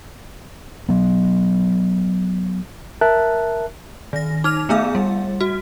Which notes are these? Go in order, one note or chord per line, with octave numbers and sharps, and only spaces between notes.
F#3 B3
A#4 E5 A5 F#6
D#3 A#6
D#4 F6 F7
A3 B3 G#4 E5 F5
G3
F#4